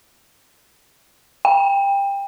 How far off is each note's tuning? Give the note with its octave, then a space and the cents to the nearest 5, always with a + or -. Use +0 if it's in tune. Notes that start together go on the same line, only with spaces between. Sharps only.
G5 +25